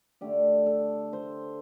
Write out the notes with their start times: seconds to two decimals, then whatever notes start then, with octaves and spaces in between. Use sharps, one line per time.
0.21 D3 A3 D4 G4
0.66 A4
1.13 C5